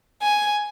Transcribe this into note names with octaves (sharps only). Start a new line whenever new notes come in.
G#5